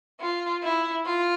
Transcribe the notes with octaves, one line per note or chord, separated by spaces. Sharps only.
F4
E4
F4